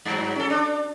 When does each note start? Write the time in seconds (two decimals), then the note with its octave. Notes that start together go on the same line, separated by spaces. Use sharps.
0.05 G2 F#3
0.35 C#4 A4
0.50 D4